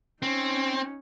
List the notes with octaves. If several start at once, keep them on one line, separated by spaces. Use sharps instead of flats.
C4 C#4 D#4